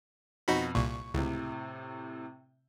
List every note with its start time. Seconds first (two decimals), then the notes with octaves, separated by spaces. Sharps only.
0.48 F2 B2 D#4 F#4 B5
0.75 C2 A#2 C#6
1.14 C#2 A2 C3